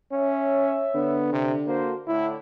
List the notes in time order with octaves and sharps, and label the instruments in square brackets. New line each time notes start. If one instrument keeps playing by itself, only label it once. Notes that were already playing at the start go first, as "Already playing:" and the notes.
[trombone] C#4 [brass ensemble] C#5 E5
[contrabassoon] D3 [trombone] B3
[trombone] C3
[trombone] A#3 [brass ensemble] F#4 A4 C5
[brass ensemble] A2 D3 [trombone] E4